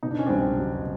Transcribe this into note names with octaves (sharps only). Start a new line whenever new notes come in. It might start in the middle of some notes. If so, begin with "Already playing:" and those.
B2 D#4
D4
C#4
C2 C4 D4
F#3